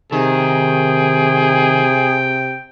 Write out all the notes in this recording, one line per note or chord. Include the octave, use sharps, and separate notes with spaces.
C3 D#3 G#4 G5